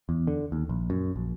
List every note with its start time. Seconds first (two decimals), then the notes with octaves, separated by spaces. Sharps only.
0.09 E2
0.27 D3
0.52 D#2
0.69 A#1
0.90 F#2
1.16 A#1